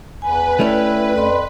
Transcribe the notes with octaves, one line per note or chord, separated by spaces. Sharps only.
E2 B4 G#5
A3 C#4 E4 D5 G5
F2 D5 B5 C6